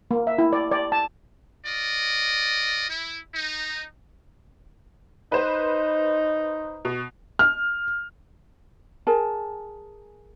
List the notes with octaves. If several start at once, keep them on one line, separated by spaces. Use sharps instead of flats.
A#3
E5
E4
D5
D5
A5
F4 D5 D#5
E4
D#4
D#4 B4 C5
B2
F6
G#4 A#4 G#5 A5